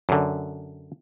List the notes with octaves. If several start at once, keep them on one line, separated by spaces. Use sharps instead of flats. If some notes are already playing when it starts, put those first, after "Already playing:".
F#2 D3